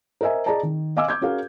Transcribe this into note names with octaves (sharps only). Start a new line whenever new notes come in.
A#4 C5 D#5 E5 G#5
G#4 D5 D#5 A5 A#5
D#3
D#5 F5 G#5 D6 E6
D6 G6 G#6
C#4 F#4 G#4 A#4 F5